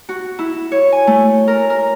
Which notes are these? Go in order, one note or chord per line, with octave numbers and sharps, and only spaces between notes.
F#4
E4
C#5
G#5
A3
A#4
A#4